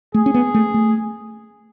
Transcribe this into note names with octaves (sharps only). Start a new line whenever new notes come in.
A3 G#4
C#4
B3
A3
A3